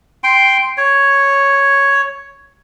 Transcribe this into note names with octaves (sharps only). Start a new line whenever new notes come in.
G5 C6
C#5